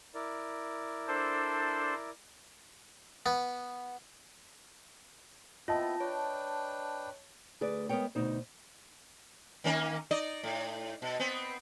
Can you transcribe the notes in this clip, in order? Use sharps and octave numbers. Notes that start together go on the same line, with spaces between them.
E4 A#4 D5
D4 A4 C5
B3
B3 C4 E4 F4 D#5 A5
D4 B4 C#5 G5
D2 G#4 B4 D5
G#3 B3 A#4 B4 C#5 G5
D2 B2 D#4 C5
D#3 A#3 C#4
D#4 D5 D#5
A2
B2
B3 C4